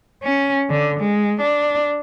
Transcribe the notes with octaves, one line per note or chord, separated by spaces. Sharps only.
C#4
D3
G#3
D4